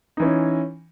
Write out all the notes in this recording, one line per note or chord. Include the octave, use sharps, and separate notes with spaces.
E3 C#4 D#4